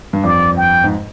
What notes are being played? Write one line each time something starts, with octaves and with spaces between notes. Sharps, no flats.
G2
F2 D5
G5
G#2